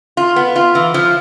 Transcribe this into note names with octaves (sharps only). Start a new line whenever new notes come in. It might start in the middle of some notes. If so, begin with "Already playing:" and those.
F4
B3
F4
E3
F3